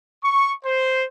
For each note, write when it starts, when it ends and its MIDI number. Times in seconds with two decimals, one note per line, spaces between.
0.24 0.51 85
0.64 1.04 72